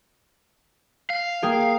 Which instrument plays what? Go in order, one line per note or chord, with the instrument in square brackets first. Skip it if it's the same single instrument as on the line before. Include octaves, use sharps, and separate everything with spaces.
[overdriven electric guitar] F5
[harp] A#3 G#4 G5